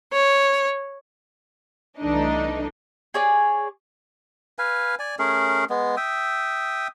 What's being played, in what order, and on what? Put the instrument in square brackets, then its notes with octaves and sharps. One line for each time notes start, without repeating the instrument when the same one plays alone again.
[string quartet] C#5
[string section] C2 E3 A3 D4 D#4 D#5
[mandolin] G#4 C#5 D5 G#5
[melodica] B4 F5 G#5
D5 G#5
A3 C#4 G#4 A#4
G#3 B3
E5 G5 D#6